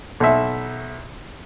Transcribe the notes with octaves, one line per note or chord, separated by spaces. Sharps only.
B1 E5